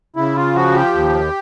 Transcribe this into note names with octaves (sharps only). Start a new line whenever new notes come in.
C#3 E4
F4
F3 F#4
G4
D#2